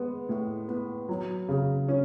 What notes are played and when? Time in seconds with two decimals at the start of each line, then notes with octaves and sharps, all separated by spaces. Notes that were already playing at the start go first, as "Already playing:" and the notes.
Already playing: G#3 B3
0.29 A2
0.69 B3
1.09 F#3
1.49 C#3
1.88 C#4